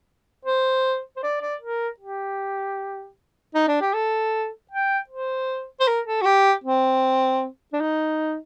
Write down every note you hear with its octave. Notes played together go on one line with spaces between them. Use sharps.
C5
C5
D5
D5
A#4
G4
D#4
D4
G4
A4
G5
C5
C5
A#4
A4
F#4
G4
C4
D4
D#4